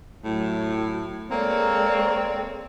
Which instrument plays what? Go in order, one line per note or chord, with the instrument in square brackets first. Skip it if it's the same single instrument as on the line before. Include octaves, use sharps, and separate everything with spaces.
[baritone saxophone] A2 [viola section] F#3
[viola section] G#3 A4 C#5 [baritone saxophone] A#3 [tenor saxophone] C4 [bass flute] D5